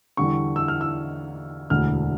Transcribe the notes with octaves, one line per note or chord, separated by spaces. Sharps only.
E2 D3 G3 C#6
E6
F6
E6
E1 D2 D3 F6